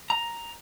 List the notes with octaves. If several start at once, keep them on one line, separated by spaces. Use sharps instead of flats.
A#5